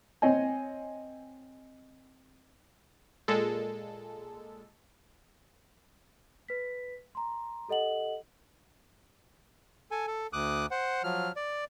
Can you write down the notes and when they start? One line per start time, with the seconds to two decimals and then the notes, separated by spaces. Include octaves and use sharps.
0.22 C4 C#5 D#5 G#5
3.28 A#2 G#3 A4
6.48 B4 B6
7.15 A#5 C6
7.69 G4 A4 D#5 F#5 F#7
9.91 A4 G#5
10.07 A4
10.33 D2 D6 D#6 F#6
10.71 C5 F#5
11.04 F3 F#3 F6
11.36 D5